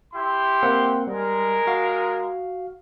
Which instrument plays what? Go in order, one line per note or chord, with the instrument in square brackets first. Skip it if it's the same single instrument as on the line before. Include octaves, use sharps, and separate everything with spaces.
[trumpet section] E4 G4 C6
[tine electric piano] A#3 C4 F#5
[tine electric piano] G3 [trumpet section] G#3 A#4
[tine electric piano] F#4 F5